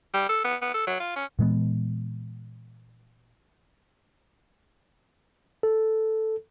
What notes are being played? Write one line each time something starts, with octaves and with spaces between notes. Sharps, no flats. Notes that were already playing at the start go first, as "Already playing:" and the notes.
G3
A4
B3
B3
A4
F#3
F4
C#4
A#2 E3 G#3 B3
A4